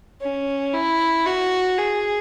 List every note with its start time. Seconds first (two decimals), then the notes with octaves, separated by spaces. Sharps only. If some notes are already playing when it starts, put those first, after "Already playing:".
0.21 C#4
0.74 E4
1.25 F#4
1.78 G#4